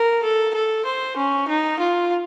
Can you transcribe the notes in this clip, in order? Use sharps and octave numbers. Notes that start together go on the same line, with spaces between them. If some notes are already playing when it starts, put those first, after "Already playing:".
Already playing: A#4
A4
A4
C5
C#4
D#4
F4